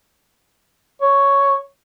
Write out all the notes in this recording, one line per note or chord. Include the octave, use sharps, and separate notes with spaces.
C#5